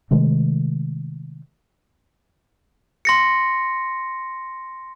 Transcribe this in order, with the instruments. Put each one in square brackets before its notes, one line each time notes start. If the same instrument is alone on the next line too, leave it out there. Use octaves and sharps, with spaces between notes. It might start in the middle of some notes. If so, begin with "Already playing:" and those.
[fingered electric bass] C3 D#3 G#3 A3
[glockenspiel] C6 A#6 C#7